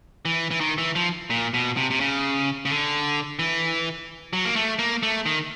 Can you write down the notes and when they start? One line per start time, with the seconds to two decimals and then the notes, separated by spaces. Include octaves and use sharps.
0.25 E3
0.51 E3
0.60 D#3
0.78 E3
0.95 F3
1.30 A#2
1.54 B2
1.77 C3
1.90 C3
2.00 C#3
2.65 C#3
2.70 D3
3.39 E3
4.33 F#3
4.45 A#3
4.56 A3
4.79 A#3
5.03 A3
5.26 D#3